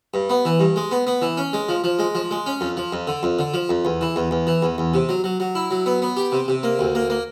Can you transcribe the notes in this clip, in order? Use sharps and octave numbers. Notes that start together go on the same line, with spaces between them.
G2
B3
E3
G2
G#3
B3
B3
E3
C#4
G#3
F3
F3
G#3
F3
G#3
C#4
F2
F3
F2
D3
F2
D3
F3
F2
E2
E3
E2
E2
E3
E2
E2
C3
F#3
F#3
F#3
E4
F#3
B3
B3
G4
C3
C3
A#3
D2
A#3
A#3